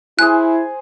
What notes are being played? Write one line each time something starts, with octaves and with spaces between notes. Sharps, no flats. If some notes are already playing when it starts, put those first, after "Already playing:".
E4 G#4 C5 G#5 F#6